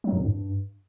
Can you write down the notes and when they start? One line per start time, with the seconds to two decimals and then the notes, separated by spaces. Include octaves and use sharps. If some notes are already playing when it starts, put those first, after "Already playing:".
0.04 F#3
0.13 F2
0.21 G2